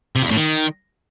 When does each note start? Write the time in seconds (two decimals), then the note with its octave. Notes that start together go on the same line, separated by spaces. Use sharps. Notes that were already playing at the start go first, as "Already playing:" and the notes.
0.16 C3
0.23 E2
0.30 A2
0.37 D#3